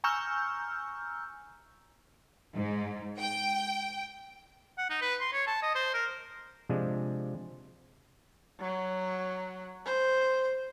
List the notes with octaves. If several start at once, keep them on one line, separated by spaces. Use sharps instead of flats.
G#5 A#5 C#6 E6 F6 G6
G#2
G5
F#5
D#4
B4
C6
C#5
A5
D#5
C5
A#4
C3 F3 G#3 D4
F#3
C5